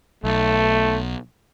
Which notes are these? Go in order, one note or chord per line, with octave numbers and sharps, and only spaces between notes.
B1 A3